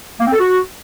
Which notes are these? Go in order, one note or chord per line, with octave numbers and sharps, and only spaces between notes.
A#3
C4
A4
F#4